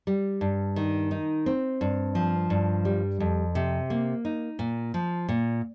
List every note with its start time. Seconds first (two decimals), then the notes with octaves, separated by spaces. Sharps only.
0.07 G3
0.41 G2
0.76 D#3
1.11 D#4
1.46 C4
1.81 G2
2.15 F3
2.50 G2
2.85 G3
3.20 F2
3.55 C3
3.90 A#3
4.25 D#4
4.59 A#2
4.94 F3
5.29 A#2